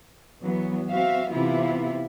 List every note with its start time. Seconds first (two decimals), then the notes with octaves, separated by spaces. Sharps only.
0.42 E3 F#3 B3
0.89 C4 F#4 E5 F5
1.31 C3 E3 B3 E4 F4